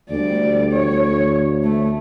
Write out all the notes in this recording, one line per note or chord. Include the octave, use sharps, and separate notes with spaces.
D2 G3 D5
C#5
A3